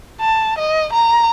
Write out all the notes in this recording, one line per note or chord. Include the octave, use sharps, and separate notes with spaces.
A5
D#5
A#5